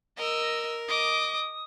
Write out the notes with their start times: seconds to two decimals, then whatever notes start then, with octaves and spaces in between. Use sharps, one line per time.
0.18 A#4 D#5 E6
0.89 D#5 D6 D#6